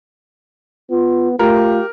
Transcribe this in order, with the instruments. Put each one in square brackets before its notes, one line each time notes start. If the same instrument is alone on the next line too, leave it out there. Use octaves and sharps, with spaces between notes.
[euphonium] B3 [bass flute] F4
[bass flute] A3 [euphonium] F4 [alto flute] G4 [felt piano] A#4